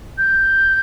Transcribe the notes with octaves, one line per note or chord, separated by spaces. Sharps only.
G6